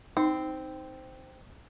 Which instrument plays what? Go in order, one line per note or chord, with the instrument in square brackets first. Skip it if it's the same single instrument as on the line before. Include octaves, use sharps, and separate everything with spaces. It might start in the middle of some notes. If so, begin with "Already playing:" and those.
[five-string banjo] C4 [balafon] D#4